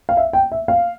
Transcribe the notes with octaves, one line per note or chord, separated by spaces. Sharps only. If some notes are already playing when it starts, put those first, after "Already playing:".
F5
E5
G5
E5
F5